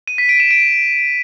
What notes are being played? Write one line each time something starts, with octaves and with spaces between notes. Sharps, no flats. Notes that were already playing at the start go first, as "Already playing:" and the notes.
D#7
B6
D7
E7
D7